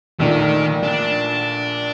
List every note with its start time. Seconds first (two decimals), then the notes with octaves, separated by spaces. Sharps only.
0.20 A#1 A#2 D#3 A3
0.83 D4